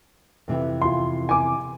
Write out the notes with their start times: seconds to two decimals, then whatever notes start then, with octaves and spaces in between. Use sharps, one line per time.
0.48 F2 C3 E3
0.82 F4 C6
1.29 G#5 D6